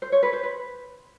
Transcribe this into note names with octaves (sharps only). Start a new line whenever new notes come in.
C5
C#5
B4
C5
B4